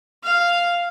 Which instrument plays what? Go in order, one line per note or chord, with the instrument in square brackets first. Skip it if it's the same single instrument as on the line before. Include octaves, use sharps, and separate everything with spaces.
[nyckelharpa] F5